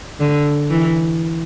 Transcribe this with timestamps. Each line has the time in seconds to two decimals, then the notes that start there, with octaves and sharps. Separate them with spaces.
0.20 D3
0.70 E3